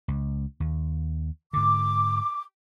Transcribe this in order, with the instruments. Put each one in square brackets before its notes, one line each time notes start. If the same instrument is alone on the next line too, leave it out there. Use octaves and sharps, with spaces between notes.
[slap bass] C#2
D#2
[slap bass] G#2 D3 [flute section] D6